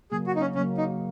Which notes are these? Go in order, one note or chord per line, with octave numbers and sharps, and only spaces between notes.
C#3 F#3 A#3 G#4
F#4
D#4
C#4
C#3 F#3 A#3 C#4
D#4